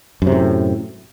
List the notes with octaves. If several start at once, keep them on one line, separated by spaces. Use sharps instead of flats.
F#2 A2 C3